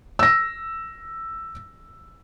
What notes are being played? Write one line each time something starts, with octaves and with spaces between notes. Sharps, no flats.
E6 A#6